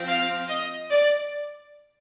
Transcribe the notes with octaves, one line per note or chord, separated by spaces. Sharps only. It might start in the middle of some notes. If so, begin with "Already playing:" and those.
Already playing: F3 C4
F5
D#5
D5